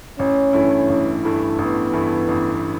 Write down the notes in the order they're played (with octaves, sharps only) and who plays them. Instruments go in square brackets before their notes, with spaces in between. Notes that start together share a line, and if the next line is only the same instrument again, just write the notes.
[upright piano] A1 [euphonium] C#4
[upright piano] G2 E3 A3 E4
A1
G2 E3 A3 E4
[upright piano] A1 [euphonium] B3
[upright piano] G2 E3 A3 E4
A1